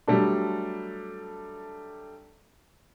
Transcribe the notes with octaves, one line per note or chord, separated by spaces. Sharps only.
F#3 G3 A3 D4